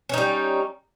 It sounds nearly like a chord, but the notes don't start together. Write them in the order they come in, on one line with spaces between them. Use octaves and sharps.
C#4 D#4 G3